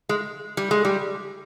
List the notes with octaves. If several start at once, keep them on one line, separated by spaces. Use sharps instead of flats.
G#3
G3
G#3
G3